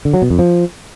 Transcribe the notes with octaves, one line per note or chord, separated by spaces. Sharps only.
D3
F#3
B2
F2
F3